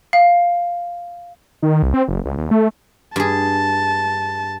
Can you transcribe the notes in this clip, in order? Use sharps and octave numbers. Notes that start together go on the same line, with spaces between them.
F5
D#3
C2
C4
F#1
C#2
D#2
A3
G2 G#4 A5